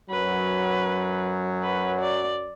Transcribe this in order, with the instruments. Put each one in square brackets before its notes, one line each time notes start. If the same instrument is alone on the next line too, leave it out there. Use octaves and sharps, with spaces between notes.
[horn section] F#2 F#3 [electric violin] B4
[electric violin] B4
D5